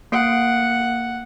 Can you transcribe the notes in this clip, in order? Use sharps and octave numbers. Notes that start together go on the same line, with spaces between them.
A#3 F#5 C7 D7